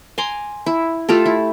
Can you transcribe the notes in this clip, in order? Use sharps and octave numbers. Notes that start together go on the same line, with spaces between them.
G#5 A#5 C6 D6
E4
A3 F4 G4 A4
E4